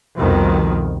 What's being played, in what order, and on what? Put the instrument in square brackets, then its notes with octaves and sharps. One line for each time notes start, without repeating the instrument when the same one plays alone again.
[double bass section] C2 F2 B2 D#3